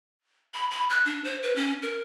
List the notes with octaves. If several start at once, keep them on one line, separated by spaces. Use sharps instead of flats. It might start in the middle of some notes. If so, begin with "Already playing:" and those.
B5
B5
F#6
D4
C5
B4
C#4
A#4